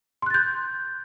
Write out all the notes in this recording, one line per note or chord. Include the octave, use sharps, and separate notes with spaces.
C6 F#6 G6 A6